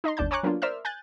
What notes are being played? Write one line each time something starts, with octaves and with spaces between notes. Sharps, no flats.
D#4 D#5 A#5 C6
G1 D#2 D4 A5 G6
C#5 G#5 A#5 C#6 D6 F#6
F#3 A#3 B3 D4 F4
A#4 C5 D5 E5 E6 F6
G#5 F#6 G6 A6